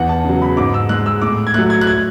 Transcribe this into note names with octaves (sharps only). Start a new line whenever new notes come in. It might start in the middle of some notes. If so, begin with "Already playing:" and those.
Already playing: E2 F#5
A5
C#3 F#3
B5
G#2 D6
E6
G#3 F#6
E6
A2 D6
G#6
F#3 A3 F#6
G#6
F#6
G#6